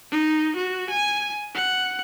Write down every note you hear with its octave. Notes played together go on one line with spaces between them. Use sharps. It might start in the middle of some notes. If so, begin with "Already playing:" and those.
D#4
F#4
G#5
F#5